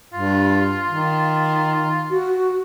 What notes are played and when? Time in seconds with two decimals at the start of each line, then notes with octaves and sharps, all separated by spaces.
0.14 G2 F4
0.88 D#3
2.10 F#4